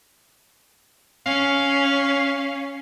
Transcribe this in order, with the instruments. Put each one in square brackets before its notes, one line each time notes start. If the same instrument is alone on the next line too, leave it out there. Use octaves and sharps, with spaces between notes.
[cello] C#4 [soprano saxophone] F5